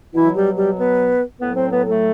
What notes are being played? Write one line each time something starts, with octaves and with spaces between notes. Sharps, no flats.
B2 E3 F#3 E4
G3 G4
G3 G4
B3 B4
A2 F#3 B3 B4
C4 C5
B3 B4
A3 A4